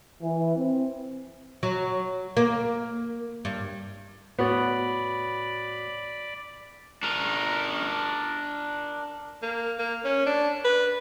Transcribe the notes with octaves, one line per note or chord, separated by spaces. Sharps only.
E3
C4
F#3
A#3
G2
A2 B3 F#4 C#5 D5 B5
D4 A#4
A#3
A#3
C#4
D4
B4